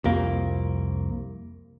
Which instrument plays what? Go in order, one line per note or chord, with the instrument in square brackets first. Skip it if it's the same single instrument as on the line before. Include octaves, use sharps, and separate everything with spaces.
[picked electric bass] C2 F2 A#3